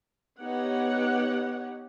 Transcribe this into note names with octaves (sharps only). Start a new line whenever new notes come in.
B3 D#4 G4 C#5 F#5